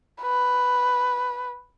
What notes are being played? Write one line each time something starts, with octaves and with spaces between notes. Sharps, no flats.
B4